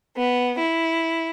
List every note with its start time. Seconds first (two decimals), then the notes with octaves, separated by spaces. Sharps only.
0.16 B3
0.58 E4